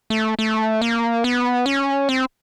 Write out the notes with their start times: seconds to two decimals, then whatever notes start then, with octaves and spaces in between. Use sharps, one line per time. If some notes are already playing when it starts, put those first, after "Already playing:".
0.10 A3
0.39 A3
0.82 A#3
1.24 B3
1.66 C#4
2.09 C4